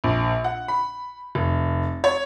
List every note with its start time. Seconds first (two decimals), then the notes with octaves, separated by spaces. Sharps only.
0.04 A#1
0.44 F#5
0.68 B5
1.35 F1
2.04 C#5